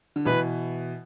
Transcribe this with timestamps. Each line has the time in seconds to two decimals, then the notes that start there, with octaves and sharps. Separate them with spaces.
0.16 D3
0.25 B2 E3 B4